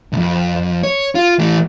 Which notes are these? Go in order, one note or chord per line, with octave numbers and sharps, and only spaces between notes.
C2 F2
C#5
F4
E3 A3